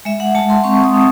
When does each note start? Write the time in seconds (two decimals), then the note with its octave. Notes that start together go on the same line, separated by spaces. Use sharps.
0.05 G#3 E5
0.20 F#5
0.35 G#3 A5
0.50 C6
0.64 C4 C#6
0.84 D#6
0.94 C4